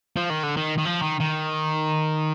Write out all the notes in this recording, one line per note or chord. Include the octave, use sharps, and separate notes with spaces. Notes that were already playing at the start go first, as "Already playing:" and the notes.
F3
D#3
D3
D#3
D#3
F3
D#3
D#3